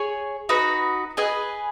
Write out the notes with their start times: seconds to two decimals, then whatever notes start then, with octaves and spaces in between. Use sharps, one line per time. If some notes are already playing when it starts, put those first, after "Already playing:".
Already playing: G#4 C#5 G#5
0.49 D#4 F#4 B4
1.17 G#4 B4 D#5 G#5